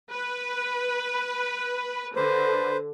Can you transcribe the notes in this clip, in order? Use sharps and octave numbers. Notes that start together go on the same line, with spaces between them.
B4
D3 B4 C5